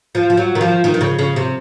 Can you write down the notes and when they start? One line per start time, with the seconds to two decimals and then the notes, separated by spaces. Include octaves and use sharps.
0.15 F3
0.30 F3
0.37 F#3
0.55 D#3
0.61 F3
0.84 D#3
0.94 D#3
1.01 C#3
1.19 C#3
1.36 C3